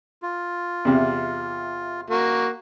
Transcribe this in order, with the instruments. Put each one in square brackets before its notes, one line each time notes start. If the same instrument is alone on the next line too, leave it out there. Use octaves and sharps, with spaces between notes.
[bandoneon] F4
[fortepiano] E2 C3
[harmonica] A#3 F#4